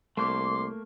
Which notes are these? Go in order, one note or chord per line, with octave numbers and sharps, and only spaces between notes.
C2 A3 A#3 C6 D6